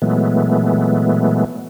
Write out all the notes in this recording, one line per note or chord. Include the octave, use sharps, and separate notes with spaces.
A#2 E3 F#3 G#3 A3 B3